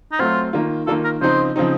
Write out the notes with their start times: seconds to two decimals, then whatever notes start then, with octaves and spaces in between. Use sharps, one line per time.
0.12 D#4
0.19 F#3 A3 C4 F4 F#4
0.53 D#3 A#3 F4
0.87 D#3 A#3 F4 A4
1.04 A#4
1.21 C#3 F3 C4 D#4 C5
1.56 C#3 F3 C4 D#4